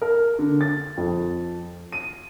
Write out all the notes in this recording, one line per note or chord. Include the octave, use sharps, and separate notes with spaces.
A#4
D3
A6
F2
D#7